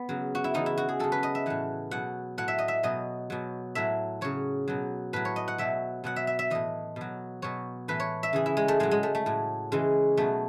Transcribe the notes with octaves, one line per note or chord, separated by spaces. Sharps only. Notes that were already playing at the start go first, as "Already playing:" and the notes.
Already playing: B3
C#3 F#3
F#4
E4
C#3 E3 D#4
E4
F#4
G#4
C#3 F#3 A4
B4
D#5
E5
A2 E3 F#5
B2 F#3 F#5
A2 F#3 F#5
E5
D#5
E5
B2 F#3 D#5
B2 F#3
A2 F#3 E5
C#3 F#3 C#5
B2 F#3
A2 F#3 B4
C#5
D#5
F#5
B2 F#3 E5
B2 F#3 F#5
E5
E5
E5
A2 E3 D#5
B2 F#3
B2 F#3 C#5
A2 E3 B4
C#5
E5
C#3 E3 G#4
E4
G#3
A3
A2 F#3 G#3
G#3
A3
A3
A2 F#3
C#3 E3 G#3
B2 F#3 A3